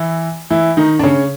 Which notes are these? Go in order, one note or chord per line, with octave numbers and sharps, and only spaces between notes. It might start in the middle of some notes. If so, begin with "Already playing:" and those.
Already playing: E3 E4
E3 E4
D#3 D#4
D4
C#3 C#4